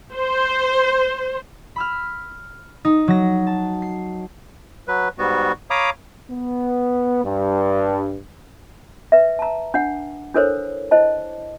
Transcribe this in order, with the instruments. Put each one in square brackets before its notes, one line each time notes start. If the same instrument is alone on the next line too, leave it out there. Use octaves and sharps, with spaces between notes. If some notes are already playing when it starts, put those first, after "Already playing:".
[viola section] C5
[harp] B5 E6 F6
D#4
F#3 A#6
A5
C7
[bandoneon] F#3 B4
G#2 G3 B3 F#4
C#5 F5 A#5 B5 D6 D#6
[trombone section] B3
G2
[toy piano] B4 E5
A5 A#5
D4 F#5
D4 E4 A4 A#4 C5 C#5
E4 C5 D#5 A5